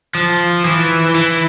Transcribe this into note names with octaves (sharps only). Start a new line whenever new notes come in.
F3
E3
E3